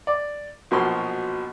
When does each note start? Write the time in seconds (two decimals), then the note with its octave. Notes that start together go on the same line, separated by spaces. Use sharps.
0.07 D5
0.71 A#1 B2 F3 F#3 C6